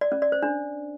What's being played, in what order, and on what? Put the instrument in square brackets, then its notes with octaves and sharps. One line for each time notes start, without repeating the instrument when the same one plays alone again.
[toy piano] D5
C#4
D5
C5
D4